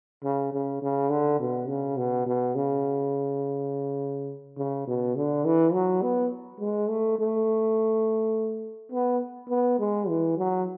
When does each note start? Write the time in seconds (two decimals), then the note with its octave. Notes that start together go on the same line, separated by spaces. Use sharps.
0.24 C#3
0.53 C#3
0.82 C#3
1.10 D3
1.39 B2
1.68 C#3
1.97 B2
2.26 B2
2.56 C#3
4.58 C#3
4.87 B2
5.16 D3
5.45 E3
5.73 F#3
6.02 B3
6.60 G#3
6.89 A3
7.19 A3
8.92 B3
9.49 B3
9.79 G#3
10.09 E3
10.37 F#3